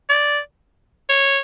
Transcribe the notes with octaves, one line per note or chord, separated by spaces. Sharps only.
D5
C#5